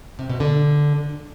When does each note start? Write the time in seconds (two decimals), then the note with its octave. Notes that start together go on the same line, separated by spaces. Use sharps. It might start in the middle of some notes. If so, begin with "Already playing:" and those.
0.19 C3
0.29 B2
0.40 D3